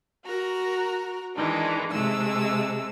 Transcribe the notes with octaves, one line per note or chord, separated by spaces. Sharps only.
F#4 A#4 A#5
D#3 E3 G#3 D4
C3 G#3 A3 E6